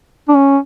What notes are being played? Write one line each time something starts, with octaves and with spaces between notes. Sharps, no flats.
D4
C#4